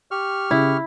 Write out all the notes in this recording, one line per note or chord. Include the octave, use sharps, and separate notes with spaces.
G4 C#6 F6
C#3 E4